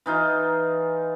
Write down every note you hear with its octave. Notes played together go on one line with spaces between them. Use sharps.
E3 D#4 F4